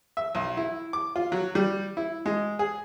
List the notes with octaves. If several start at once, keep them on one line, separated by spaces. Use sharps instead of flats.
E5
B1
E4
D6
F4
F#3
G3
E4
G#3
G#4